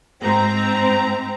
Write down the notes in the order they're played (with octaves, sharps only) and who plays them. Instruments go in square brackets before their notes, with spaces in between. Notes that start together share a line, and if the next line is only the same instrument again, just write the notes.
[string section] G#2 C4 A#5